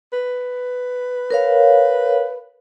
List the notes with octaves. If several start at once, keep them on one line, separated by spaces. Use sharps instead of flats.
B4
A#4 C#5 F5